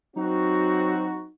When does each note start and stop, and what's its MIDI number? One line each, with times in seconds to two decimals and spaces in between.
0.17 1.26 54
0.17 1.26 60
0.17 1.31 63
0.17 1.26 66